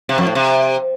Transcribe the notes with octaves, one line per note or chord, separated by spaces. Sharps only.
C3
F2
A2
C3